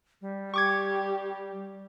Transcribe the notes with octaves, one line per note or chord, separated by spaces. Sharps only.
G3
G4 C#6 D6 G#6